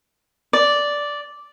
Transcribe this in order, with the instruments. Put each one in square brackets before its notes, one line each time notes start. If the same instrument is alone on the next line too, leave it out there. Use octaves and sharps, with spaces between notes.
[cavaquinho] D5